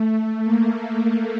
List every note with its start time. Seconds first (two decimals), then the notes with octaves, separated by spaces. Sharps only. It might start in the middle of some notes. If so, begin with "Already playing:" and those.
Already playing: A3
0.45 A#3